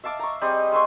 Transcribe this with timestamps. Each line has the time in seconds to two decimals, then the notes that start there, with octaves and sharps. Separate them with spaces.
0.04 E5 F5 A5 D6
0.19 A#5 C#6
0.41 G3 C4 G#4 D#5
0.72 G#3 E5 C6 C#6